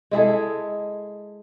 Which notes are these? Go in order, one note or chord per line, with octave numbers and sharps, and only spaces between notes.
G#3 E4 G#4 A4